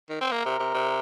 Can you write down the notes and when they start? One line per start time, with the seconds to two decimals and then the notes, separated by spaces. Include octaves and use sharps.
0.10 D#3
0.21 C4
0.31 A#3 A#4
0.46 C3
0.59 C3
0.74 C3